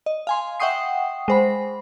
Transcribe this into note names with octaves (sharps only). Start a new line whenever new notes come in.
D#5
F5 G#5 C6
E5 F#5 G5 C#6 D#6 C7
G#3 C5 B5